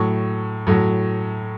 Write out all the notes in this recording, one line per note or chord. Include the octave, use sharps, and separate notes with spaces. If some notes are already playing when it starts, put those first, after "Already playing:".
Already playing: A2 F#3 C#6
A2 F#3